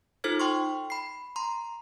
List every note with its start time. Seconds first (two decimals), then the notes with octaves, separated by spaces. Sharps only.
0.24 D#4 F4 A4 C5 F6 G#6
0.40 G5 C6 C#6
0.90 B5 C7
1.36 A#5 C6